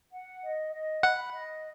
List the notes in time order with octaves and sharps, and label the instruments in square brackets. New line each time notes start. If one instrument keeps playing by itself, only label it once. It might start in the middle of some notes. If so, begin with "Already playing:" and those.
[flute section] F#5
D#5
D#5
[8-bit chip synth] F#5 [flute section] B5
[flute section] D#5